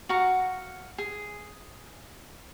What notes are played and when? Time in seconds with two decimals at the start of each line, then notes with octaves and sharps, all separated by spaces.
0.09 F#4 F5 F#5 A#5
0.98 G#4